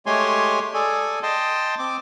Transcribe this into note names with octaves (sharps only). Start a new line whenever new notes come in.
G#3 A3 G4 C#5 G#5 C6
G#4 A4 D5 G#5
D#5 G5 A5 C6
C4 D6